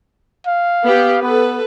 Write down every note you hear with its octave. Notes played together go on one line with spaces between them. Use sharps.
F5
B3 G4
B3 A4 B4